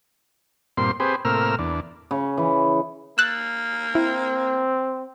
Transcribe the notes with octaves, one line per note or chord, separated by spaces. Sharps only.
G2 A#2 C4 C6
C4 G4 G#4 B4 C5
A2 C3 A#3 A#4 E6 F6
E2 D4
C#3
E3
A#3 E6 F#6 A6
C4 E4